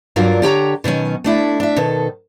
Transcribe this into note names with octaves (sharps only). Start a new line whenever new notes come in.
G2 F#3 D4 F4 A#4
D3 G4 C#5 A#5
B2 D#3 F#3 C#4
A3 D4 E4
D4 E5
B2 D#3 A4